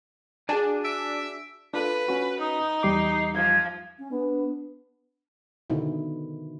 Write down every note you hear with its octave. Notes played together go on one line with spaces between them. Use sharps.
D4 F#4 G#4 D5 G#5 A5
E5 D7
D4 F4 A4 B4
C#4 F#4
D#4 D#6
E2 G3 D6 C7
F3 G#6
C#4
B3 D4
B2 D3 D#3 E4